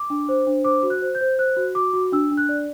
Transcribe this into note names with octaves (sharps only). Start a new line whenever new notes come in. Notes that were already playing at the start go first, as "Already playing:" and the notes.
Already playing: D6
D4
C5
D4
C5 D6
F#4
F#6
C5
G6
C5
C5 F#6
F#4
F#4 D6
F#4
D4 E6
D4
F#6
D5